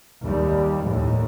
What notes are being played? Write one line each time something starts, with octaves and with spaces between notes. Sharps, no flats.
D#2 G3
D#2 A2